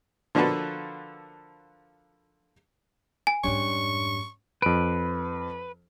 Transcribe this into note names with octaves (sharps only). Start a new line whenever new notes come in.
D3 F3 A#3 F#4 A4 B4
G#5
F2 G#2 G3 C#4 D4 C#6
F2 B4 D7